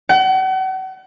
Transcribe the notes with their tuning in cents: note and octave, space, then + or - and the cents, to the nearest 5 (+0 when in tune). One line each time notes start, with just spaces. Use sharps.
F#5 +40